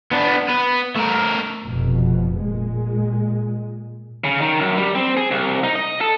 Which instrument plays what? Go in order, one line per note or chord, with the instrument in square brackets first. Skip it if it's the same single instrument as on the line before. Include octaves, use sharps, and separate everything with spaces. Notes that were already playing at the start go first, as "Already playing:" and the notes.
[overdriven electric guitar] B3 D4
B3 B4
A3 A#4
[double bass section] F1 F2 B2
A#2 G#3
[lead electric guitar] C#3
D#3
F#2
G3
C4
G#4
C2
D#4
D#5
A4